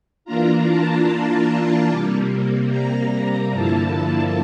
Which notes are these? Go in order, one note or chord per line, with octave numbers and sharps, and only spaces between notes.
E3 A#3 D4 F4 A#5
A5
C3 G3 A#3
A#5
G2 D3 F3 A#3 E4 A5